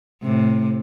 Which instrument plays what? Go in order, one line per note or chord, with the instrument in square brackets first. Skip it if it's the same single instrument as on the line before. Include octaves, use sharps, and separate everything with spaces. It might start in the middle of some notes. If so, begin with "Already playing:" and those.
[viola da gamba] A2 C3